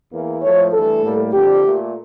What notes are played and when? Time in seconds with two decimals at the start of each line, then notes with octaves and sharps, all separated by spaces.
0.12 E2 E3 A#3
0.42 A2 F3 A3 C#5
0.72 G2 E3 A3 A4
1.03 A2 G3 A#3
1.33 F2 D3 G3 G4
1.63 A#2 A3